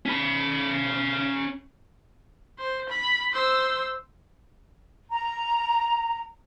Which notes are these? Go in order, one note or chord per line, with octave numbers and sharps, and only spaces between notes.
C#4 B5
C5
B5
C5 E6
A#5